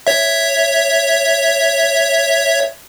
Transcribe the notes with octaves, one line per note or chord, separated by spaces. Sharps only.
C#5 E5